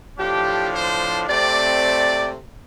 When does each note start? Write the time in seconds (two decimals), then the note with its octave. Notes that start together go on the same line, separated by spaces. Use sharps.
0.18 A2 F3 D4 G4
0.73 C5
1.28 C3 A3 C4 D5